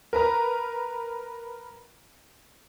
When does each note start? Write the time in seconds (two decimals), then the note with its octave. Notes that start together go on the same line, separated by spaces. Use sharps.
0.13 A#4 B4 A#5